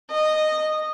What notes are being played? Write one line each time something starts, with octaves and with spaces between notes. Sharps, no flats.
D#5